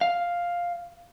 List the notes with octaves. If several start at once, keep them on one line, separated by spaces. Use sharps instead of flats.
F5